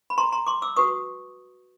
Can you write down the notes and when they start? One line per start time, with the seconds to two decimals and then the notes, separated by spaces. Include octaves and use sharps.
0.10 B5
0.18 A#5 C6
0.32 A#5 C6
0.47 C6 D6
0.62 D6 E6
0.76 F#4 B4 C#6 D#6